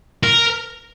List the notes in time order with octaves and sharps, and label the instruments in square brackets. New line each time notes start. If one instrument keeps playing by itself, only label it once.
[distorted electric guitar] A#4